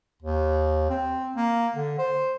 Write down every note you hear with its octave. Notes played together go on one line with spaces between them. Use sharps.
D#2
C4
A#3
D3
C5